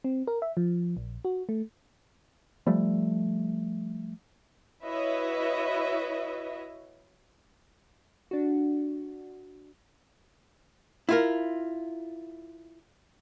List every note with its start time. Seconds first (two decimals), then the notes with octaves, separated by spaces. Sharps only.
0.04 C4
0.27 A#4
0.42 E5
0.57 F3
0.97 A#1
1.25 F#4
1.49 A3
2.67 F3 G3 A3
4.84 E4 F#4 B4 C#5 D#5 E5
8.31 D4 F#4
11.09 E4 F4 A#4